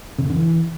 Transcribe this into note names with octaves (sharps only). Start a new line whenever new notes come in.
C#3
C3
D3
E3